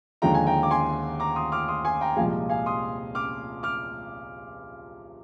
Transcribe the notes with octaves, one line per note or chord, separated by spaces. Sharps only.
D#2 D3 F3 G#3 G5 A#5
G#5
G5 A#5
D6
G#5 C6
A#5 D6
C6 D#6
D6 F6
C6 D#6
G#5 C6
G5 A#5
C2 A#2 F3 G#3 F5 G#5
F5 G#5
C6 D#6
D6 F6
D6 F6